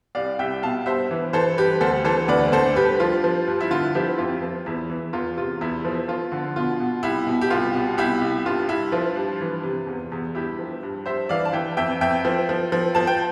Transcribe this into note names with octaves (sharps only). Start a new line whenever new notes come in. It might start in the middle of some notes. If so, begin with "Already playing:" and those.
C2 D5 F5
C2 E5 G5
B2 F5 A5
G2 C5 E5
E3
E3 A4 C5
G2 G4 B4
D2 A4 C5
E3 A4 C5
D2 B4 D5
D2 A4 C5
G2 G4 B4
F3 F4
F3
G2
E4
D3 F4
F3 E4 G4
F2 F4
F3
E2 E4
E3
E2 F4
C3 F4
E2 E4
F3
F3 F4
D3
B2 F4
B2
C2 E4
B2
G4
C2 F4
B2
C2 E4 G4
C2
G2 F4
G2 E4
F3 F4
G2
E3
C3
E2
E2
G2 E4 G4
F3
G2
G2 C5 E5
E3 D5 F5
A5
E3 E5 G5
F2 E5 G5
F2 E5 G5
F3
F3
F3
F3 A5
G5